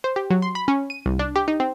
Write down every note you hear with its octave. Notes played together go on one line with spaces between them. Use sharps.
C5
G4
F#3
C6
B5
C#4
D#7
C2
D4
G4
D#4
C4